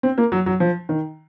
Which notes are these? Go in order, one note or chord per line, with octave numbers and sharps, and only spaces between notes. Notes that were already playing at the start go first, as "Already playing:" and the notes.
C4
A#3
F#3
F#3
F3
D#3